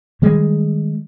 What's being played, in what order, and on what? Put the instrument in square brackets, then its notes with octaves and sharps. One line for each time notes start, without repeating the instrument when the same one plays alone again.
[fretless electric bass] D#3 G3 G#3